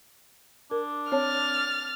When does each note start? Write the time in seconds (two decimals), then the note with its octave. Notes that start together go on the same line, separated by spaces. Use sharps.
0.71 D4 A#4
1.12 C4 C#5 A5 F6 A6